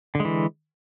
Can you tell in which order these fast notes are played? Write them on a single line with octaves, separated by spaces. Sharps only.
D3 G#3 E3